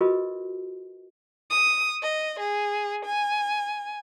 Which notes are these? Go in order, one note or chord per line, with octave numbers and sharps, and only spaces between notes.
F4 F#4 G#4 A#4 B4 D#5
D#6
D#5
G#4
G#5